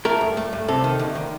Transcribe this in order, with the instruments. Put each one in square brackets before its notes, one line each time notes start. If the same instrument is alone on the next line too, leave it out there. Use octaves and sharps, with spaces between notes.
[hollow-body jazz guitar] A3 A#4
G2
A3
G2
C3 A4
D#3
D2
D#3